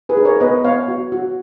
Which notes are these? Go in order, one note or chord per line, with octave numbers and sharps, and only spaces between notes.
G#4 B4
D#4
A#4 C#5
B3 B4 D#5
B3 C#5 F5
F#4
F#4